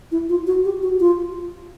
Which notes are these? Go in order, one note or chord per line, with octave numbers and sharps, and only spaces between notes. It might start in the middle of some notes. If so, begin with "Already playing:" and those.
E4
F4
F#4
G4
F#4
F4